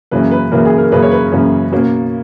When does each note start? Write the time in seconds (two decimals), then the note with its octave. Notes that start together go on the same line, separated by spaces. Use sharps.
0.11 F#2 C#3 E3 A#3 C#4 B4
0.31 B4
0.51 F#2 C#3 E3 A#3 C#4 A#4
0.65 G#4
0.78 A#4
0.92 F#2 C#3 E3 A#3 C#4 B4
1.02 C#5
1.11 B4
1.32 F#2 C#3 E3 A#3 C#4
1.72 B2 A#3 C#4